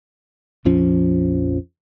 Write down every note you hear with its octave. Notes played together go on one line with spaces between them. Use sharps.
A#1 F2 F3 C#4